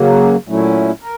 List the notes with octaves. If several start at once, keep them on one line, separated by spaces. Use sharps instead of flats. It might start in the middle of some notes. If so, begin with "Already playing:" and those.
Already playing: C#3 F#3 A#3
A#2 F#3 A3 C#4 E4
A#4